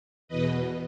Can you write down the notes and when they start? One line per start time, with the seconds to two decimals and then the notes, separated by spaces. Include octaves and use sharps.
0.28 E2 B2 B4 D#5